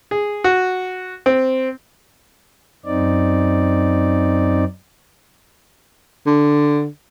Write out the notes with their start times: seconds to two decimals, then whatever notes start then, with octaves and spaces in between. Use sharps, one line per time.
0.11 G#4
0.44 F#4
1.26 C4
2.86 F#2 C4 D#4 D5
6.26 D3